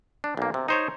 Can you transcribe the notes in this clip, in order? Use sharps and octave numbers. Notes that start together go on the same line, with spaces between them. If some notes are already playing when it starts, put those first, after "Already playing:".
D4
B1 A#3
C3
D#4 C5 C#5